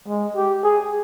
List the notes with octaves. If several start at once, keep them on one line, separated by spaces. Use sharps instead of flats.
G#3
G4
G#4